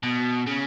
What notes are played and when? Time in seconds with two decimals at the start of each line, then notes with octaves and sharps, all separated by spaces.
0.03 B2
0.47 C#3